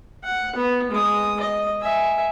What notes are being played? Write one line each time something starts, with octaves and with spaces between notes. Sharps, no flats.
F#5
B3
G#3 D#6
D#5
E5 G#5